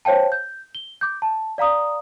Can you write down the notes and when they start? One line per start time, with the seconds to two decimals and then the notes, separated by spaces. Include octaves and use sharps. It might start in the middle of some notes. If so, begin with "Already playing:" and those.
0.05 C5 C#5 F5 G5 A5
0.32 G6
0.75 G7
1.01 D6 G6
1.22 A5
1.58 D5 F5 A#5 D#6